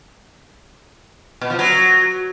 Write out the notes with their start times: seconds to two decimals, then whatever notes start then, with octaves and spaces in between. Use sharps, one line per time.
1.41 B2
1.50 F3
1.59 F#3